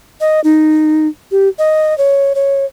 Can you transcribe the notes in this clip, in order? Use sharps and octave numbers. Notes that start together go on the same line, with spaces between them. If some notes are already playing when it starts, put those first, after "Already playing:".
D#5
D#4
G4
D#5
C#5
C#5